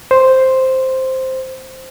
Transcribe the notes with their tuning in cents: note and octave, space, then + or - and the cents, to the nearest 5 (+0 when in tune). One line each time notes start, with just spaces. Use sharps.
C5 +0